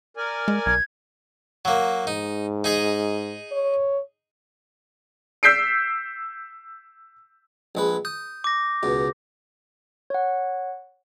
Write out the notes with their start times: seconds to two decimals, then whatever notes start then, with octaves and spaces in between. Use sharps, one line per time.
0.17 A#4 D5 G#5
0.48 G#3
0.66 B1 G#6
1.65 F#3 A#3
2.07 G#2 D#4
2.64 D#4 G#4 D#5
3.52 C#5
5.43 E6 G6 B6 C7 D7
7.75 A#1 G#3 B4
8.05 D#6 G6
8.44 D6 A#6
8.83 C#2 B2
10.10 C#5 F#5